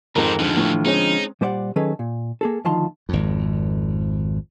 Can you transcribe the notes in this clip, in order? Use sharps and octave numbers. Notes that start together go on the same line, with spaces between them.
F2 G#2 D#3 C4 A#4
D#2 D3 E3 F3 F4
A2
G#3 C4 C#4 D#4
A#2 G3 C5 D5 E5 F#5
D#3 F#3 C#4 G#4 A4 B4
A#2
A#3 G#4 A4
D2 D#3 F3 F4 A5 C6
G#1 F2